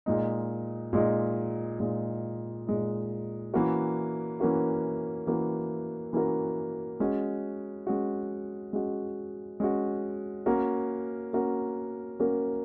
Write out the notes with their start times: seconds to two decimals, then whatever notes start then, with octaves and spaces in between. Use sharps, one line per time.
0.06 A#2 G#3 D#4
0.93 A#2 G#3 D#4
1.80 A#2 G#3 D#4
2.67 A#2 G#3 D#4
3.54 E3 A#3 C#4 F#4 A#4
4.40 E3 A#3 C#4 F#4 A#4
5.27 E3 A#3 C#4 F#4 A#4
6.13 E3 A#3 C#4 F#4 A#4
7.00 G#3 C#4 F#4
7.87 G#3 C#4 F#4
8.73 G#3 C#4 F#4
9.60 G#3 C#4 F#4
10.46 A#3 C#4 F#4 A#4
11.33 A#3 C#4 F#4 A#4
12.20 A#3 C#4 F#4 A#4